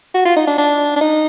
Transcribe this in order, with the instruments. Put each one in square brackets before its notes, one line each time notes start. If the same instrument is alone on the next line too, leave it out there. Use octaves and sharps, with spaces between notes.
[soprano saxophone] F#4
F4
D#4
D4
D4
D4
D#4